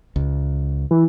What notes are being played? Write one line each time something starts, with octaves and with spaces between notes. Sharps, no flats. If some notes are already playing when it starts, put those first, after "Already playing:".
C#2
E3